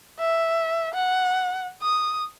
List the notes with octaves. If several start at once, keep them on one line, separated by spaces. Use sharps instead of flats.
E5
F#5
D#6